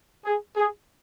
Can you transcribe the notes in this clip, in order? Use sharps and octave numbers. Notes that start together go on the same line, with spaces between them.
G#4
G#4